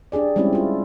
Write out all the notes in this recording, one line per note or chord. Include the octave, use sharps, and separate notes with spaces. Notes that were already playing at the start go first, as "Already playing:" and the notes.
D4 G4 G#4 D5
G3 G#3 C4 C#4 E4 G4
E4 F4